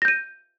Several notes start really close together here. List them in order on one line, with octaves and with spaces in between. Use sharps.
A#6 G6 D#7